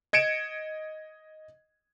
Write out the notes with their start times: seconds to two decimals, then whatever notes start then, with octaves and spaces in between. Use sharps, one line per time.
0.13 D#5 G#6 C#7 D7 E7